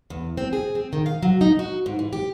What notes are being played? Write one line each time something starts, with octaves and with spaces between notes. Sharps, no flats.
E2
C4
G#4
C4
D#3
F5
F#3
D#4
F#4
G#2
E3
G4